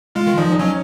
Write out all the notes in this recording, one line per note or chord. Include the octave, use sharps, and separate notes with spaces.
G#3 F4
D#3
F3 D#4
D#4
F#3 C#4